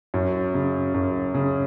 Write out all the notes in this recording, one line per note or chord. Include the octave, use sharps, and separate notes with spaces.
F#2
C#3
F#2
C#3